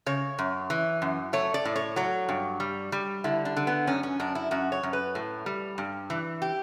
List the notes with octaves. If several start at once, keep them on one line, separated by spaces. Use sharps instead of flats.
C#3 C#5
F#2
E3
F#2
A3 C#5
D5
A2
C#5
F#3 C#5
G2
G3
G3
D3 E4
D4
D3
B3
F#2 C#4
C#4
F#2 D4
E4
F#2 F#4
C#5
F#2
B4
A2
G3
G2
E3
G4